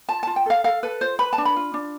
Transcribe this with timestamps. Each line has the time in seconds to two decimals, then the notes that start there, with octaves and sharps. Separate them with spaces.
0.09 F4 A5
0.23 F4 A5
0.36 G5
0.46 A4 F5
0.64 A4 F5
0.83 A4 B4
1.01 F4 C5
1.19 B4 B5
1.33 A5
1.38 D4
1.45 B5
1.56 F4
1.74 D4